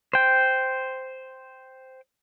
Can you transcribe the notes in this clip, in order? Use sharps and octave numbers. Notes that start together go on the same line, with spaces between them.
C5 G5